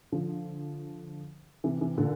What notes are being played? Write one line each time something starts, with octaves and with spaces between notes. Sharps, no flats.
D3 F3
C3 E3
C3 E3
A#2 D3